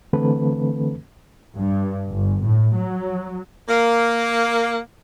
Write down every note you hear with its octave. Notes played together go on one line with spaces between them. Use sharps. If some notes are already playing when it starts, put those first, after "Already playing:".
D3 E3 A3 C4 A4 B4
G2
G1
A2
F#3
A#3